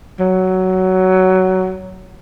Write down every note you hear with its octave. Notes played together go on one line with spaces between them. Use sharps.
F#3